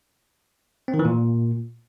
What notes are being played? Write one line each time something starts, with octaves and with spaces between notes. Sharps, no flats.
C4
D#3
E3
A#2